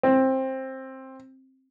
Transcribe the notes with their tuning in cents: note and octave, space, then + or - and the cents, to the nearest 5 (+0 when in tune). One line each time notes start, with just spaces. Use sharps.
C4 +15